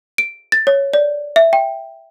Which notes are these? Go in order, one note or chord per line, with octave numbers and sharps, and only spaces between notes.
D7
A6
C#5
D5
E5
G5